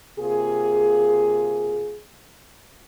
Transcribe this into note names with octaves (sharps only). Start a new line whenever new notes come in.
C3 A#3 F4 G#4